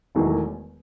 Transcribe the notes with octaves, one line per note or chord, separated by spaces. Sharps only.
E1 E2 D#3 F#3 A3